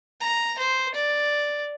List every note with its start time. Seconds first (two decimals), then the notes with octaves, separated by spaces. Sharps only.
0.21 A#5
0.59 C5
0.94 D5